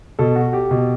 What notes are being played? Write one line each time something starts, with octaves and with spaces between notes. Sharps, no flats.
B2 A4
F#4
G4
B2